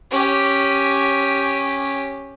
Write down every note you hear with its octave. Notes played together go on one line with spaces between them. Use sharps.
C#4 G4